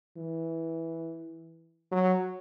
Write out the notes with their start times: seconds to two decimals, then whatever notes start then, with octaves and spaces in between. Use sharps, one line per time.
0.17 E3
1.92 F#3